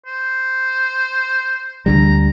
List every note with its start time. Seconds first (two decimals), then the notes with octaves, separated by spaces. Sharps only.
0.06 C5
1.86 D2 D3 G3 A#5